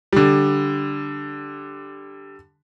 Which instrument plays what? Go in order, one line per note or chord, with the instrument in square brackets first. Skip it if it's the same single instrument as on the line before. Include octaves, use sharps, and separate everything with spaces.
[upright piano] D3 G3